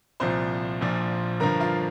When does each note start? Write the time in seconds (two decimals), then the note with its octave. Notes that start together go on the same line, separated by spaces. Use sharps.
0.20 C2 A#2 F3 C5 C6
0.81 A#1 A#2 F3
1.40 G1 G2 F3 A#4 A#5
1.60 F4 F5